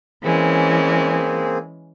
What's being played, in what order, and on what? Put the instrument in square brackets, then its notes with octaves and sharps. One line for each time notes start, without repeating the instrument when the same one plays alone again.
[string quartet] E3 G#3 C#4 [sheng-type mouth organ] A#3 C4 G#4